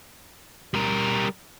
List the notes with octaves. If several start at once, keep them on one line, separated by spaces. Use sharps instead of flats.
G3 A#4